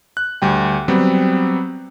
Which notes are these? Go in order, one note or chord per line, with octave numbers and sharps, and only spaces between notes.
F#6
D2 G3 G5
F#3 G3 B3 C4